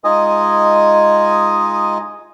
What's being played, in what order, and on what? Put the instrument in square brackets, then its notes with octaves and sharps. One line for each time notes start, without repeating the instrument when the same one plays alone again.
[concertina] G#3 D#4 F4 D#5 G#5 D#6